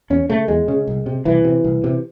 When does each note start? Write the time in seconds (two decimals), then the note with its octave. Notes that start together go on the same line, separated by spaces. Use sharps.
0.10 E2 C#4
0.30 C#3 A3
0.48 E2 G#3
0.68 C#3
0.87 C2
1.06 C3
1.25 C2 E3
1.45 C3
1.64 C2
1.84 C3